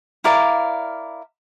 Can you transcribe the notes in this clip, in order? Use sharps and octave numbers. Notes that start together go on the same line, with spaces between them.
E4 A#4 D5 F5